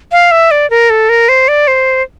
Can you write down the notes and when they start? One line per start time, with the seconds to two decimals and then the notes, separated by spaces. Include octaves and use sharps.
0.12 F5
0.31 E5
0.51 D5
0.70 A#4
0.90 A4
1.09 A#4
1.29 C5
1.48 D5
1.68 C5